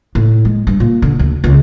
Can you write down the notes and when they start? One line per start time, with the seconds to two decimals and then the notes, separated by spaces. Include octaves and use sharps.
0.15 A2
0.45 G#3
0.67 G2
0.80 A#2
1.02 D3
1.19 D2
1.44 C#2